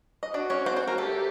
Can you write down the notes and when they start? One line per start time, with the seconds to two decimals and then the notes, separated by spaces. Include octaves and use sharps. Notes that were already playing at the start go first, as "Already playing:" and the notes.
0.23 D#5
0.34 D4 F#4 D5
0.50 C#4 C#5
0.66 C4 C5
0.76 C4 C5
0.88 A#3 A#4
0.98 A3 G4 A4